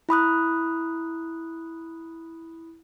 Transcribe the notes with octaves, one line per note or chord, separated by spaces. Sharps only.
E4 B5 D#6 F#6